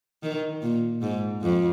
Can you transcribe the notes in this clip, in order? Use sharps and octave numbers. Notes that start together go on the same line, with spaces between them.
D#3
A#2
G#2
F2